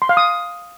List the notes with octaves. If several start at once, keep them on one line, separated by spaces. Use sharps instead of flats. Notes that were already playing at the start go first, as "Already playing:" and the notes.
C6
F5
D#6